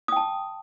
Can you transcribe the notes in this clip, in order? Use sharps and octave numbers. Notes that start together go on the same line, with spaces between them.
G5 A5 D#6